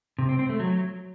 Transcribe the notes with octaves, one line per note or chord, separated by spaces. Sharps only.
C3
C4
C4
A3
F#3